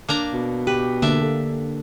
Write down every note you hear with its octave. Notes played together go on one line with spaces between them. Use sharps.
A#3 D4 A#5
B2
G4 B4
D3 A#3 D4 E5
A4